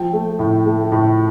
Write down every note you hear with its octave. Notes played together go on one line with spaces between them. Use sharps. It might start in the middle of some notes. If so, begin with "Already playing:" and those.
Already playing: F3 G5
A3
A2
A3
A2